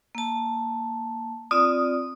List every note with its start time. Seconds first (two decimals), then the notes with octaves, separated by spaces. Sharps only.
0.15 A#3 A5
1.51 C4 F4 D5 D#6